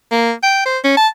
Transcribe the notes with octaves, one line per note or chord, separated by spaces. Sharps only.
A#3
G5
C5
C#4
A5